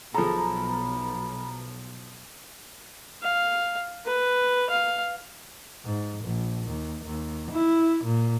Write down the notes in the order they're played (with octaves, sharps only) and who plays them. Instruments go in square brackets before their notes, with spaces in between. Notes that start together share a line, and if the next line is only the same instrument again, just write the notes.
[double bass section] B1 [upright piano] F3 G#4 A4 [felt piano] A#5 [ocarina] B5
[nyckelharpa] F5
B4
F5
[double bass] G#2
A#1
D#2
D#2
E4
A#2